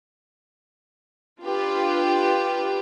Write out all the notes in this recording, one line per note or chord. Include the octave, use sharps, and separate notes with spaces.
D4 F4 G4 B4